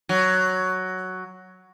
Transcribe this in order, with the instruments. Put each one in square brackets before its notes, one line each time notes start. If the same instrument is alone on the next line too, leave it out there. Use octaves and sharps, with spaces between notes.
[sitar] F#3